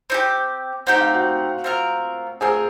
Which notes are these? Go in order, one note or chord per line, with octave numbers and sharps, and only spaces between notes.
C4 D#4 G4
C4 D#4 G4 F#5
F5
F#4 F#5
C4 F4 A#4
C4 F4 G#4 A#4 G#5